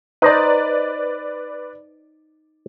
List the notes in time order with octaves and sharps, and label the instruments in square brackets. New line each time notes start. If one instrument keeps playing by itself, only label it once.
[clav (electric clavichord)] D#4 C5 D#5 [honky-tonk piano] B4 D5